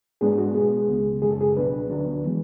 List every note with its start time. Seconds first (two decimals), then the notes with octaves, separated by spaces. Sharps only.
0.21 G#2 G#3 B3 D4 G#4
0.32 G#4
0.38 F#4
0.55 B2 G#3 B3 G#4
0.88 C#2 C#3 G#3
1.22 F#2 C#3 G#3 G#4
1.31 A4
1.41 G#4
1.56 C#2 B2 F#3 B3 D4 B4
1.90 D2 D3 F#3 B3 D4
2.26 E3 G#3